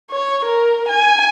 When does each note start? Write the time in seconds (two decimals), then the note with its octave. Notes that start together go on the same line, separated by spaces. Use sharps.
0.11 C#5
0.45 A#4
0.89 G#5